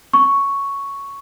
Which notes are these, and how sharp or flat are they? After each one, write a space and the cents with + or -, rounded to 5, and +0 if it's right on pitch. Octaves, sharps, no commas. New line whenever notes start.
C#6 +0